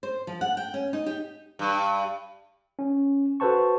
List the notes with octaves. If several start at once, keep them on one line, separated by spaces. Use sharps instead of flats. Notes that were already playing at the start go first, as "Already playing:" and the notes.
C5
F3
F#5
G5
C#4
D#4
G4
G2
C#4
F#4 A4 B4 C5 A5 C#6